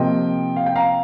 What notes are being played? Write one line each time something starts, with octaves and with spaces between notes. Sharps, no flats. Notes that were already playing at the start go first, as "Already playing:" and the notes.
Already playing: C3 F3 A#3 D#5 G5
F5
G5
F5 A#5